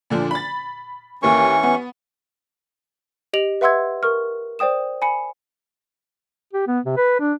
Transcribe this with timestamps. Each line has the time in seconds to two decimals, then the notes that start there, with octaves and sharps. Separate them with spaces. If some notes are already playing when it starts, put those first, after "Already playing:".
0.10 A#2 D3 F3
0.31 B5 A6
1.23 D#2 E3 A#3 C#4 C#6
1.63 B3
3.33 G4 D#5 D7 F7 F#7
3.61 B4 E5 F#5 C6 E6 G#6
4.03 A#4 C#6 F6
4.59 C5 D5 G5 D#6 E7
5.02 G#5 B5 C#7
6.53 G4
6.67 B3
6.85 C3
6.97 B4
7.20 D4